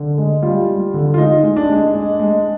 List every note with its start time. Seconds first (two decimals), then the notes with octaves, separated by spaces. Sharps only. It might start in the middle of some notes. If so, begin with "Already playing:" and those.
Already playing: D3
0.18 G#3
0.42 G3 F4
0.67 G3
0.94 D3
1.14 F4
1.18 G#3 D#4
1.43 G#3
1.56 D4
1.69 G#3
1.95 G#3
2.20 G#3